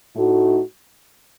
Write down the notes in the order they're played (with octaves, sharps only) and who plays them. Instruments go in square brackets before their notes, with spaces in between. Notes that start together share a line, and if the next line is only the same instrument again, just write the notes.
[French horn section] A2 A3 D#4 F#4